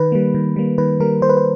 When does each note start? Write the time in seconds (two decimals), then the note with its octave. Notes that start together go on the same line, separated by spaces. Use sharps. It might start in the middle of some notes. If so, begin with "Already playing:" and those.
Already playing: D#3 B4
0.12 G3 A#3
0.35 D#3
0.56 G3 A#3
0.78 D#3 B4
1.00 G3 A#3 A#4
1.22 D#3 C5
1.29 B4
1.37 C5